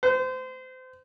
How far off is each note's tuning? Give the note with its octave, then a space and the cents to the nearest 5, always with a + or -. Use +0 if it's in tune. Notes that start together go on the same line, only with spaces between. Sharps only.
C5 -30